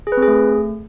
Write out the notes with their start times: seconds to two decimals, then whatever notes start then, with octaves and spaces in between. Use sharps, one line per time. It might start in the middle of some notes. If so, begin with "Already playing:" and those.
0.07 G#4
0.12 B4
0.17 C4
0.22 G#4
0.28 A3